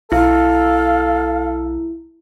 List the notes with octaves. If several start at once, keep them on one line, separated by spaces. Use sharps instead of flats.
B1 E4 A4 F5